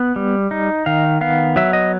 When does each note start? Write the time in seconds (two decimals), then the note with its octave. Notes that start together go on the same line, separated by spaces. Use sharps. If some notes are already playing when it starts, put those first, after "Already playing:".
Already playing: B3 F#5
0.16 G3
0.51 D#4
0.86 D#3 F5
1.21 B3 F5
1.56 F#3 E5
1.73 D#5